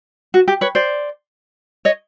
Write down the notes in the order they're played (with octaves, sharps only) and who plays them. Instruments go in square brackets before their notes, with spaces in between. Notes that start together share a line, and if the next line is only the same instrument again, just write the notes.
[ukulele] F#4
G4
B4 C#5
C5 D5
C#5 D#5